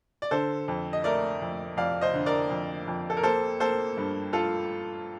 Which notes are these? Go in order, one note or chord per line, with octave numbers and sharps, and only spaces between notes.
D5
D3 A4 C5
F2
D#5
A3 A#4 D5
F2
F2 D5 F5
C5 D#5
D3
A#4 D5
F2
F2
A4
A#4
A#3 A4 C5
A#3 A4 C5
G2
F4 A4